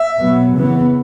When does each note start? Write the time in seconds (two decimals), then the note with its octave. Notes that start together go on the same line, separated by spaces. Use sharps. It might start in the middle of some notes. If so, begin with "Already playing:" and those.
Already playing: E5
0.20 B2 F#3 B3
0.55 C#3 E3 B3